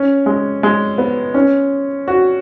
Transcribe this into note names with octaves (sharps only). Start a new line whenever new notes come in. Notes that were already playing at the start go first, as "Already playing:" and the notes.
Already playing: C#4
G#3
G#3
B3
C#4
F#4